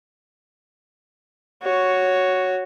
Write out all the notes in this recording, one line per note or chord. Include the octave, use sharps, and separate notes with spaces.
F#4 C#5